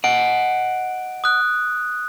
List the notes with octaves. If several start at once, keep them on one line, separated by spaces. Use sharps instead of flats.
D#5 F#5 D7
D#6 F#6